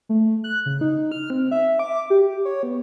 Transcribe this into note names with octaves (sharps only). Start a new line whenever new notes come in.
A3
F#6
C#3
D#4
F6
C4
E5
D6
G4
C#5
B3